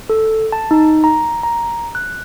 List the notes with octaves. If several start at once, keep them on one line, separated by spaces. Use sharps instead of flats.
A4
A5
D#4
A#5
A#5
F#6